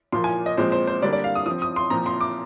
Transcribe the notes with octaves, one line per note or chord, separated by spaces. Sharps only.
A#2 F3 A#3 C6
G#5
D#5
A#2 F3 G#3 C4 C5
C5
C5
D3 G3 A#3 D4 D5
D5
F5
D#6
F3 C4 D#6
D#6
C6
A#2 F3 C4 A#5
C6
D6